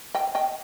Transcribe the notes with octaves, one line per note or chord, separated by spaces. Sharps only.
D#5 G5
D#5 G5